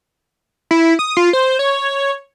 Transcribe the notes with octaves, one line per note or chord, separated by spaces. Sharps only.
E4
D#6
F4
C5
C#5